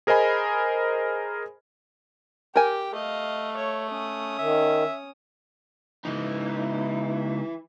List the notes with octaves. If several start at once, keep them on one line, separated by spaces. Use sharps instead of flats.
G#4 A#4 C5 D#5 G#5 B5
G4 A#4 G5 G#5
A3 D#5 F5
C#5
C#4 D#6
D#3 E5
C#2 E3 D#4